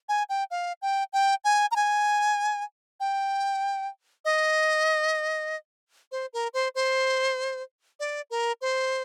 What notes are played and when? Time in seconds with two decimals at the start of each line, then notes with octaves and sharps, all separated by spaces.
0.09 G#5
0.29 G5
0.51 F5
0.82 G5
1.13 G5
1.44 G#5
1.71 A#5
1.76 G#5
3.00 G5
4.25 D#5
6.12 C5
6.33 A#4
6.54 C5
6.75 C5
8.00 D5
8.30 A#4
8.61 C5